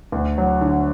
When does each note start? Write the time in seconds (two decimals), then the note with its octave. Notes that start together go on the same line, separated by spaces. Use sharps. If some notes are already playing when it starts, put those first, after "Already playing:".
0.12 D2
0.38 F#3
0.61 D3